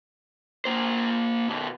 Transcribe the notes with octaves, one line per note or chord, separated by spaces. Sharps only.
A#3 C5
B2 D#3